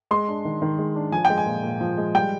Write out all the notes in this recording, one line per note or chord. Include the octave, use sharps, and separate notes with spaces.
G#3 C6
D4
D#3
D#3
G#3
D4
F3 G#5
G5
G#3
G#5
A#2
A#2
F3
G#3
G3 G5